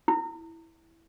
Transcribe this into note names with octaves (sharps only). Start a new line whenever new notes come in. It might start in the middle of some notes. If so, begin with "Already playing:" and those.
E4